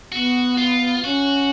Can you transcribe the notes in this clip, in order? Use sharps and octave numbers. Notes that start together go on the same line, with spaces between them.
B3 F#4
F4
C#4 F#4